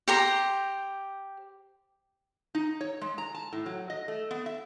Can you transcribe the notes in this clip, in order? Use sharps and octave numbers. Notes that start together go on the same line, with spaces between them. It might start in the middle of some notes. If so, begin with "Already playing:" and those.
G4 C5 A#5
D#4
C#5
G#3
A#5
A5
A2
F#3
D#5
A3
B3
E5